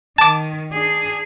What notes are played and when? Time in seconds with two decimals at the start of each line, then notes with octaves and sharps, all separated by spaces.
0.18 D#3 A5 D6
0.72 D4 G#4